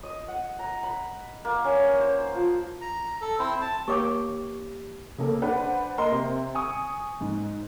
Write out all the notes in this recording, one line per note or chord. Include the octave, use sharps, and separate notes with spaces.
D#5
F#5
A#5
B5
A#3
C#4
C5
F3
A#5
A4
C4 E4 C5
A5
A#3 G4 C#5 G5 C#6 D6
C#3 A#3 A4
D4 B4 C5 F#5
A#3 A#4 D#5 C6
C3
G#5 C#6 D#6
G#2